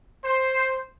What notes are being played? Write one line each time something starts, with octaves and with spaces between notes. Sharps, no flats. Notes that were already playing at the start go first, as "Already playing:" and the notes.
C5